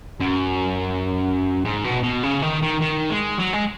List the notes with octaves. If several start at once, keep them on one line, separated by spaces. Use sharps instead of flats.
F#2
G#2
B2
B2
C#3
D#3
D#3
D#3
G#3
F#3
G#3